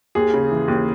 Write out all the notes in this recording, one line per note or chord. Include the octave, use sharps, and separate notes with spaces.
D#2 G#4
C#3
E3
D#2